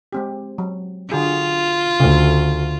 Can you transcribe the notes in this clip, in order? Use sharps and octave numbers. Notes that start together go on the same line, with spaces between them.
G#3 C4 G4
F#3
D3 F4 F#4 G#4
D2 C#3 A3